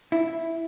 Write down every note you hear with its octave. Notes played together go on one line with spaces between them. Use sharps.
E4